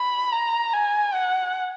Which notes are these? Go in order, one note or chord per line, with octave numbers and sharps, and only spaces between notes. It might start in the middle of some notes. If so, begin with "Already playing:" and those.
Already playing: B5
A#5
G#5
F#5